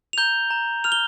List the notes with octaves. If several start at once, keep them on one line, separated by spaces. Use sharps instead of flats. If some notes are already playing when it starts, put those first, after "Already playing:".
F7
A#5 G6 G7
A#5
F6 F7
G7